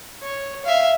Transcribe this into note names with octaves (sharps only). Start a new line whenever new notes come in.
C#5
E5 F5